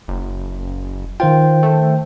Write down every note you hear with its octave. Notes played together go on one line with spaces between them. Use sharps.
F#1
D#3 F4 C5 G5
A3